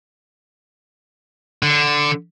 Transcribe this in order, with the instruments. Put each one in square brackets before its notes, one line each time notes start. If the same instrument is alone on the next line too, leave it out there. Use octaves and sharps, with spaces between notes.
[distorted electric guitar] D3